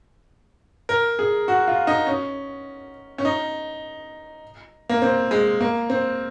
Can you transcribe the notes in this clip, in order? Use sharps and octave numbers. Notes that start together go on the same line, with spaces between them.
A#4
G#4
F#4
F4
D#4
C#4
C#4
D#4
A#3
C4
G#3
A#3
C4